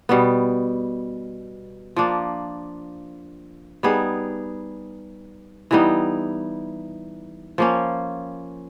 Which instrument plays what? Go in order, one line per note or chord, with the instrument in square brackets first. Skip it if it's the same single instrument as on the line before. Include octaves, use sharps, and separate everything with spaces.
[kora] B2 G3 B3
F3 A#3 D4
G3 B3 D#4 G#4
E3 G3 B3 D#4
F3 A#3 C#4